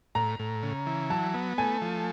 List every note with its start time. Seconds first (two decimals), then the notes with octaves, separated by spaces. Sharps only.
0.15 A2 A#5
0.39 A2
0.63 C#3
0.87 E3
1.10 F#3 A5
1.34 B3
1.58 A3 G#5
1.82 F3